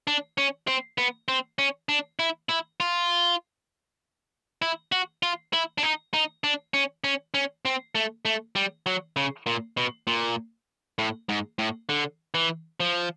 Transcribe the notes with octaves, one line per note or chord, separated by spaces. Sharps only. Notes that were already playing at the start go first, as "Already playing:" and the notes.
D4
C#4
C4
B3
C4
C#4
D4
E4
E4
F4
E4
F#4
F4
E4
D4
D#4
D#4
D4
C#4
C#4
C#4
C4
A3
A3
G3
F#3
C#3
A#2
B2
A#2
A2
G#2
A2
D3
E3
F3